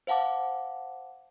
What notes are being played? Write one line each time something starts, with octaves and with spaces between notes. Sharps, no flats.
C5 F5 F#5 A5 D6